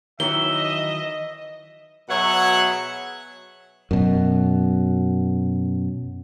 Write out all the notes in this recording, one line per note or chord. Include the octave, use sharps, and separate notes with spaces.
D#3 E3 F#3 E5 G7
D#5
B2 F#3 G#4 C#5 E5 F#5
F#2 B2